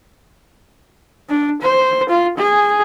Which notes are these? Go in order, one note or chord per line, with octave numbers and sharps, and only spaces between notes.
D4
C5
F4
G#4